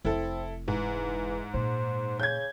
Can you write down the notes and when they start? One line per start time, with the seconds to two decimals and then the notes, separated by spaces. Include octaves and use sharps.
0.05 F1 C4 E4 A4
0.68 G#2 E3
1.54 A#2 C5
2.20 C#3 G6 G#6